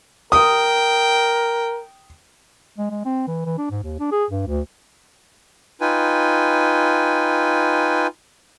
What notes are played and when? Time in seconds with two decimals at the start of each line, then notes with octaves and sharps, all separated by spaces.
0.32 A#4 G5 D#6
2.78 G#3
2.90 G#3
3.05 C4
3.27 E3
3.45 E3
3.58 D4
3.71 G#2
3.83 D#2
3.99 D4
4.12 G#4
4.30 G2
4.47 D2
5.81 D#4 F4 B4 G5 G#5